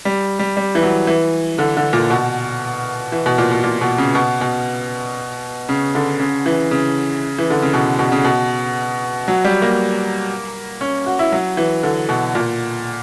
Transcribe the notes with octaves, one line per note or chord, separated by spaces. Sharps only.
G3
G3
G3
E3
F#3
E3
D3
D3
A#2
B2
E3
B2
A#2
B2
A#2
B2
C#3
B2
B2
C#3
D3
C#3
E3
C#3
E3
D3
C#3
B2
B2
C#3
B2
F#3
G3
A#3
C#4
F#4
E4
F#3
E3
D3
B2
A#2